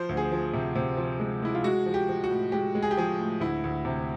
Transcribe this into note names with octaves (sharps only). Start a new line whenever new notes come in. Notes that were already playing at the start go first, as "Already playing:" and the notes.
Already playing: F3 C5
D2
G#4
F3
C3
C3
F3
G#3
G#3 E4
F4
G#3 F#4
F3
G4
F3
F#4
A2
G#3 G4
G#3
G#4
G4
F3 G#4
A2
D2 E4
D2
C3